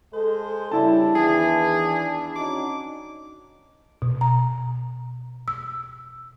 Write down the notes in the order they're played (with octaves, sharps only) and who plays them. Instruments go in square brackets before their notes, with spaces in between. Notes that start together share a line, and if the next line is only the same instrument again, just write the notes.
[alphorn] G#3 [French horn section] A4 [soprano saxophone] C5
[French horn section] C#3 G3 [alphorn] D4 [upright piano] E4 A5
[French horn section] E2 D#3 E3 [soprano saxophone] G#4
[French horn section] C#4 D#4 F#4 [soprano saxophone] D6
[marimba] B2
A#5
E6